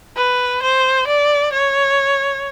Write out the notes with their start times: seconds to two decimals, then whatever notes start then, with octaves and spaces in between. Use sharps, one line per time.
0.17 B4
0.62 C5
1.07 D5
1.53 C#5